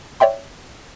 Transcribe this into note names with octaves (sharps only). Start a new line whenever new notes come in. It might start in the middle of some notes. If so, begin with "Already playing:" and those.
C#5 D5 E5 G5 C6